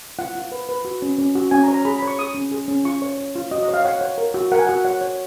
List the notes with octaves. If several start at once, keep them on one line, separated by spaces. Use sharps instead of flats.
F4 F#5
F4
B4
B4
F#4
C#4
C#4
F#4
C#4 G#5
A#5
C#5
A#5
G#4 B5
B5
C#5
C#6
G#4 D#6
C#4
G#4
C#4
F4 C#6
C#5
C#5
F4
F#4 D#5
D#5
C#5
F5
C#5 F#5
C#5
A#4
F#4
A#4 F#5
G#5
F#4 F#5
C#5 F#5
C#5